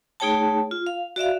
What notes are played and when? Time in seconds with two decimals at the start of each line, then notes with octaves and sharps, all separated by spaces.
0.20 A3 D#4 G#4 C#5 G5 A5
0.71 F4
0.86 F5
1.16 F#4 D5 E5 F5